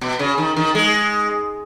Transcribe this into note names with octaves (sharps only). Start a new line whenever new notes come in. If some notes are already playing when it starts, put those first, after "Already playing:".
B2
C#3
D#3
D#3
G#3